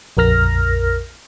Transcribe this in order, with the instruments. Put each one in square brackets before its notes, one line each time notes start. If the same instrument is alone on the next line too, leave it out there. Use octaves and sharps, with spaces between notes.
[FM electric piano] A#1 F2 A#4 F6 A#6